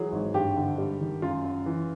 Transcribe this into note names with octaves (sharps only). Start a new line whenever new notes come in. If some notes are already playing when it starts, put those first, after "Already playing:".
Already playing: E3 F#3 G#4
G#1
G2 G4
D3
G3
D#3
F#2 F4
F#2
E3